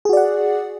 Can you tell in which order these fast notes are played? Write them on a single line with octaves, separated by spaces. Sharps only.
G#4 F#4 D5 F#5